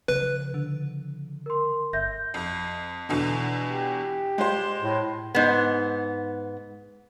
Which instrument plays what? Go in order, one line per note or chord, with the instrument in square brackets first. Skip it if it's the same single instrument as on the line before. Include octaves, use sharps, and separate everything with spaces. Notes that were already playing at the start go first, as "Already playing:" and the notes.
[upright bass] C#3 F3 [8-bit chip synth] B4
[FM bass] D3
[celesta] A#4 C6
[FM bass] G1 [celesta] E5 G6 A#6
[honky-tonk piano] F2
E2 B2 D3
[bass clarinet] G4
[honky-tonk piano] G#3 C5
[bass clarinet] A2
[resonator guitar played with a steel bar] G#2 B3